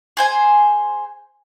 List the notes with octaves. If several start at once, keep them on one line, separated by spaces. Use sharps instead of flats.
G#4 C5 G#5